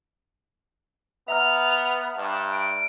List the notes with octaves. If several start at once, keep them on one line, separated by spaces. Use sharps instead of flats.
B3 E5 A#5 F6 F7
G2 A5
D7